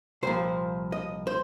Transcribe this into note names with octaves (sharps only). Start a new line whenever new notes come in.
C2 A#2 F3 C5
D#5
C5